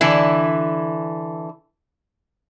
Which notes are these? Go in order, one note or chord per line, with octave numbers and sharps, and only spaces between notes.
D3 E3 E4